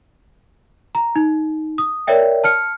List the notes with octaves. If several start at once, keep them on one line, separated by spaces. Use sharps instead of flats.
A#5
D#4
D#6
A#4 C#5 D5 E5 G5
A5 F6 C#7